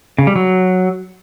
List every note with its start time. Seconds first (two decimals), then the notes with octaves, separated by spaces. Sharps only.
0.18 C#3
0.27 G3
0.36 F#3